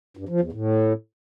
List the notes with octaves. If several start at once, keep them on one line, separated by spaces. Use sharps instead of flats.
G2
F3
E2
A2